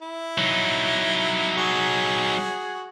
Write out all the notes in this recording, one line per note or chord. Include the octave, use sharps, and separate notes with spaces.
E4
F#3 D#4
F#4 G#4